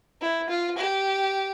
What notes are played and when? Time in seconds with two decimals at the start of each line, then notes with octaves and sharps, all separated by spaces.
0.21 E4
0.49 F4
0.77 G4